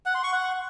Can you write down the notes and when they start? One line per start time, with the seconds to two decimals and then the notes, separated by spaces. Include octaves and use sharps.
0.06 F#5
0.15 C6
0.24 C#6
0.33 F#5